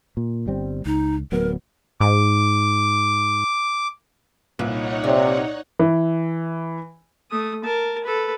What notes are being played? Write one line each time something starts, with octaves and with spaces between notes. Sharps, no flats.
A#2
G1 G3 C4
C#2 D#4
D1 F#3 B3 A#4
G#2 D6
C2 A#2 D#4 B4 C#5 F#5
C3 D5
E3
A3 D#6
A#4 A5
A4 B4